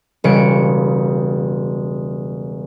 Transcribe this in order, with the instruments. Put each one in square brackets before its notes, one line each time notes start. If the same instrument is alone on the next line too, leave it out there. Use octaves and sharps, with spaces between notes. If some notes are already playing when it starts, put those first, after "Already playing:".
[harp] E1 C#3 G3 C#7 D7